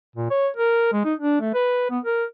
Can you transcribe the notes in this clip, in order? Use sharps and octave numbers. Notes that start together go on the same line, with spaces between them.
A#2
C#5
A#4
G#3
D#4
D4
A3
B4
B3
A#4